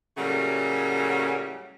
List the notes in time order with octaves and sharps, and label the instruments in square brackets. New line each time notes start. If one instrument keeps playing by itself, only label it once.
[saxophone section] A2 C#3 F#3 G3 A3 A#3